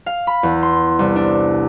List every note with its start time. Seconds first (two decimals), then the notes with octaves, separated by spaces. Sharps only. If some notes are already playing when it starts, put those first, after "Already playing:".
0.06 F5
0.27 B5
0.43 E2
0.63 C6
0.99 C2
1.16 D4